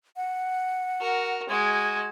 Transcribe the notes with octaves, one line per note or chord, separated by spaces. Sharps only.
F#5
F#4 A#4
G#3 F#4 G#6